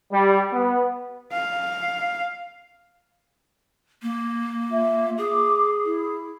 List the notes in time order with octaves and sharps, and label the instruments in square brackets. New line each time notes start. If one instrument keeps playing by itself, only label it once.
[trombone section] G3
B3
[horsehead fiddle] F5
[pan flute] A#3
[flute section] F4 E5
[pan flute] G#4 [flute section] D6
[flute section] E4